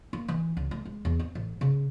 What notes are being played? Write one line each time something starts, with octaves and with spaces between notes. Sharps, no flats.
A#3
E3
C#2
A3
G#3
E2
C4
A1
C#3